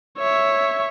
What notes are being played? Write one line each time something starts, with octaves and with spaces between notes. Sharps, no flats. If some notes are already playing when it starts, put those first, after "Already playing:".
C#5 E5